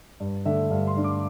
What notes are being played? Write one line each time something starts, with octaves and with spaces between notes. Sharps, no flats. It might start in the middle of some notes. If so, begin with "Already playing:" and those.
G2
D3 A3 D4 E5
G2 F5
C6
D3 A3 D4
D6